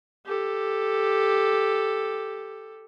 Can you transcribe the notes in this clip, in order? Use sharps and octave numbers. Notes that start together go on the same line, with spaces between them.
G4 A4